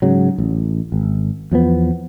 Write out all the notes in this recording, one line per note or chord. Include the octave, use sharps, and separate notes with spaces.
G#2 C#3 F#3
A1
G#1
E2 F3 F#3 B3